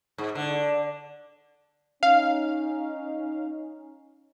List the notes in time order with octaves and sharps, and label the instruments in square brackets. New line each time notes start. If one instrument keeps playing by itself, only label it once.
[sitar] G#2
D3
[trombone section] C#4 D#4 [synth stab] F5